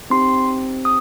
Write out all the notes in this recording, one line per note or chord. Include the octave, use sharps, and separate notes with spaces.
C4 D#4 G4 C6
D#6